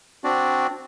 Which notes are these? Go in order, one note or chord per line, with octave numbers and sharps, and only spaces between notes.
C4 D4 F#4 D5